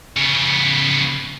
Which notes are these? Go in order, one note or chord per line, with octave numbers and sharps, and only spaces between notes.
C#3 B3